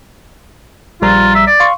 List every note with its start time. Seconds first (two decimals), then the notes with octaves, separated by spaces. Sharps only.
1.02 A#1 G3 F4 A#5
1.35 E5
1.47 D5
1.60 F5 C6 C#6